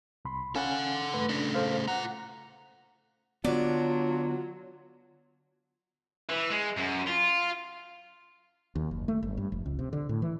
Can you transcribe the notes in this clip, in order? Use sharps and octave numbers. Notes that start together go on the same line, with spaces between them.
C2 B5 C6
C#4 A4 F5 F#5 G#5
G2 A3 B4
C#3 A3 D4
A4 C5 F5
F4 F#5 A#5
D3 F#3 B3 D4 F4
E3
G#3
F#2
F4
D#2
F#1
A3
G1
G2
F1
C#2
C3
D3
A2
E3